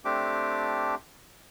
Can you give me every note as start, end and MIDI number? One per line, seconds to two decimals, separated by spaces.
0.05 0.95 57
0.05 0.95 60
0.05 0.95 62
0.05 0.95 67
0.05 0.95 86